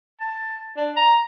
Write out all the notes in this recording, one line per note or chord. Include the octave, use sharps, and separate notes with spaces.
A5
D4
A#5